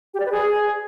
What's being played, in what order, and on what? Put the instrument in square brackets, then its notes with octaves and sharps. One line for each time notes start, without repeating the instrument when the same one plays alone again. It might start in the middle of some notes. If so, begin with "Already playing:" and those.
[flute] G4
D5
B4
G#4